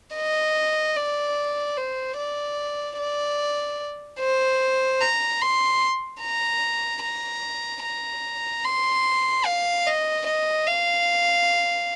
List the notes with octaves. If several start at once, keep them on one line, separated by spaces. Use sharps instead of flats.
D#5
D5
C5
D5
D5
C5
A#5
C6
A#5
A#5
A#5
C6
F5
D#5
D#5
F5